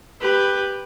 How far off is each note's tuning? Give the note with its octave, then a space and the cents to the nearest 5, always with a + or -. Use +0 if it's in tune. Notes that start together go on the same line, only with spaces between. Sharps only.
G4 +10 B4 +0